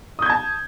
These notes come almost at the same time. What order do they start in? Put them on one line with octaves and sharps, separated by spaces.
D#6 G6 G#6 A5